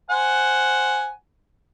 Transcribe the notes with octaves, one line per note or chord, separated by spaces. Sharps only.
C5 F#5 G#5